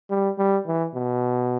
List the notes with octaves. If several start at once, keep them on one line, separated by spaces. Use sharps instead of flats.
G3
G3
E3
B2